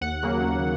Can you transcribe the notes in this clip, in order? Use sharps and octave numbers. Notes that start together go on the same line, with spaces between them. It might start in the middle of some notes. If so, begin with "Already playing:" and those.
D#2 F#5
C#3 F#3 A#3
D#2